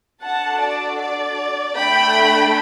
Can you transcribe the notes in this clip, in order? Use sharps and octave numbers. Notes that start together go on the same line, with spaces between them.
D4 F#4 A4 F#5 A5
D5
D5
A3 D4 A4 G5 B5